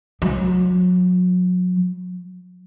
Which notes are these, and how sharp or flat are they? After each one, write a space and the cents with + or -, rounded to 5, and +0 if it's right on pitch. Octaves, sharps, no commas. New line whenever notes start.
F#3 -30